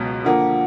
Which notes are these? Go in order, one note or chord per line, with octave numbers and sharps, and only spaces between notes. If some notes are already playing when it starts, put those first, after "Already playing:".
Already playing: C#2 B2 F#3 B3
D3 F3 A#3 F#5